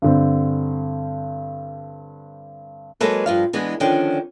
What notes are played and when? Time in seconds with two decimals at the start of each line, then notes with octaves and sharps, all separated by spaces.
0.02 G2 D3 C4
3.01 F#3 G#3 A#3 A4 B4
3.26 G2 F3 F5
3.53 E3 G#3 B3 D4
3.80 D3 D#3 F3 C#4 D4 G5